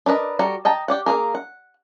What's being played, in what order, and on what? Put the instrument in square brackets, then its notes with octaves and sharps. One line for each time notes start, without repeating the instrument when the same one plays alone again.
[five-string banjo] D4 A#4 B4 D#5
G3 F#4 A4 A#5
D#5 G5 A5 A#5
G4 D5 F#5
A#3 F4 G#4 A#4
F#5